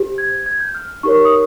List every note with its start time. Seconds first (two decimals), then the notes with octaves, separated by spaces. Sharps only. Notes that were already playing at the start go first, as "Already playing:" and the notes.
Already playing: G4 C5
0.18 G#6
0.46 G#6
0.60 G6
0.74 F6
1.03 D#4 G4 A#4 C#5 C#6
1.25 D#6